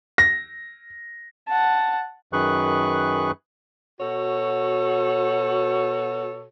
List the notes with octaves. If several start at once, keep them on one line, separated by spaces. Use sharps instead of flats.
A#6
F#5 A5
F#2 D#3 G#4 B4 C#6 F#6
B2 F#4 A4 C#5